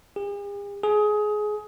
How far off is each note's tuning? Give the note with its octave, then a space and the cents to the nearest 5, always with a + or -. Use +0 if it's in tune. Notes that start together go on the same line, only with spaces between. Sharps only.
G#4 -45
G#4 +20